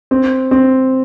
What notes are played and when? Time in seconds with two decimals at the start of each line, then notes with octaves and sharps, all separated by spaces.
0.11 C4
0.51 C4